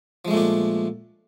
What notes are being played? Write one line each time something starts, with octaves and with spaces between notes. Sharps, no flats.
A#2 F3 G#3 A3 D4